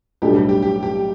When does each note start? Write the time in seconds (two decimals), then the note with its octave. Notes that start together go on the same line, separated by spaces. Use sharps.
0.22 B1 A2 G3 D4 G4 A4
0.35 G4
0.49 G4
0.63 G4
0.83 G4